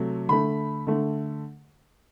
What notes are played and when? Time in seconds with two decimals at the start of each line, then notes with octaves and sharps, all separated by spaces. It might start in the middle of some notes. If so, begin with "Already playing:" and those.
Already playing: C3 F#3 A3
0.29 D3 A3 B5
0.87 D3 A3